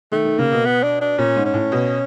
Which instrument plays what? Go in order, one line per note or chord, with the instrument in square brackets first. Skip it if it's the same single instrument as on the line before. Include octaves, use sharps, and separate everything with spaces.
[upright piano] D#3 [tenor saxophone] A3
[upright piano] D#3
[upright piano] C#3 [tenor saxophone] A#3
[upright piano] B2
[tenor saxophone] B3
D4
D4
[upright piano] A#2 [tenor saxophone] C#4
[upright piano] G#2
[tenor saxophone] C#4
[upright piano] A2
B2